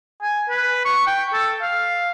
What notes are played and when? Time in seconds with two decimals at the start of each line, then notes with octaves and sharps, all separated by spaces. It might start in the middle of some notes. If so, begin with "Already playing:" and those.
0.22 G#5
0.49 B4
0.85 C#6
1.07 G5
1.33 A4
1.62 F5